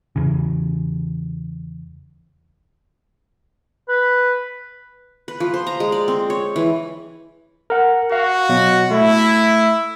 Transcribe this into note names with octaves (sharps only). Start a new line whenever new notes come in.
E2 C#3
B4
B4
F3
C5
A#5
G#3
D5
C4
C#5
E3
A#4 F#5
F#4 F5
B2 F#3
A3 E4